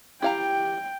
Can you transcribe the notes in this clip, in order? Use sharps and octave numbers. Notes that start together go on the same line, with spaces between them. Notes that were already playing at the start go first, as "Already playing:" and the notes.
E4 G4 F5 G5 A#5